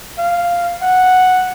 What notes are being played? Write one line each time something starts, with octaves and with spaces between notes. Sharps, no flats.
F5
F#5